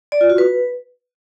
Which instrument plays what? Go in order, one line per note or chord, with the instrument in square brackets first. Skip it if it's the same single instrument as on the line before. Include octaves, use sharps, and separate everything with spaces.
[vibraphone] D5
F4
F#4
B4